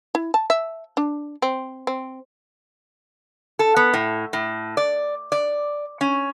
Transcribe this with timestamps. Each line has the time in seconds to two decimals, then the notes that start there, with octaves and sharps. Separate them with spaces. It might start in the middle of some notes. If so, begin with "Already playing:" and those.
0.15 E4
0.34 A5
0.50 E5
0.97 D4
1.42 C4
1.87 C4
3.59 A4
3.76 B3
3.94 A2
4.33 A2
4.77 D5
5.32 D5
6.01 C#4